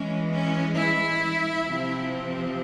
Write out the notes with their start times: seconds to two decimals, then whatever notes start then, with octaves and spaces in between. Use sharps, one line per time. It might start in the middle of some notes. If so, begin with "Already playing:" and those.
Already playing: E3 G#3 C#4
0.31 C#4
0.77 E4
1.65 C3 F3 C4